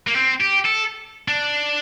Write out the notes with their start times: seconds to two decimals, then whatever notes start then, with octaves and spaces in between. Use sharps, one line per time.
0.07 A#3
0.15 C4
0.41 G4
0.66 A4
1.28 D4